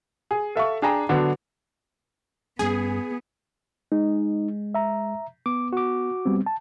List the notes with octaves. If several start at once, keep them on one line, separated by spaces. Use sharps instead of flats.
G#4
A4 E5 F5 C#6
D4 G#4 G5 A#5
D3 F#3 B3 D4
G2 G3 B3 C#4 G#4
G#3 D#4
E5 A#5
B3 D6
F#4 D6
G3 B3 C4
A5